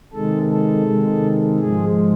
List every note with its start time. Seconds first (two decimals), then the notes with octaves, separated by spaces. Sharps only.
0.13 C3 D#3 G#3 A4
0.51 A4
0.86 C3 D#3 G#3
1.59 G#2 F3 G#3 G#4